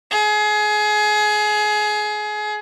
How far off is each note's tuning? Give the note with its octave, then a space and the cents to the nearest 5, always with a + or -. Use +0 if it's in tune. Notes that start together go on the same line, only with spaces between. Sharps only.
G#4 +25